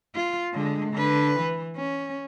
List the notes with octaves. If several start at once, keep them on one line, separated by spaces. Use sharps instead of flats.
F4
D3 G#3
D3 B4
E3
C#4